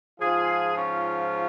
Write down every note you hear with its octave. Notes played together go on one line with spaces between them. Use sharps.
G#2 F3 F4 G#4
C#4 F4